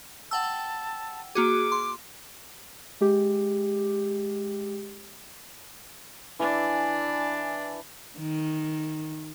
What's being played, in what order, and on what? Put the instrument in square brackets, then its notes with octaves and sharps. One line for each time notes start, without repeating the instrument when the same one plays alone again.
[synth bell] F#5 G5 E6 [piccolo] A5
[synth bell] A#3 F#4 G#4 [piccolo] D6
[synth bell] C6
[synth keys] G#3 G4
[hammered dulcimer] E3 [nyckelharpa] D4
[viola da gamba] D#3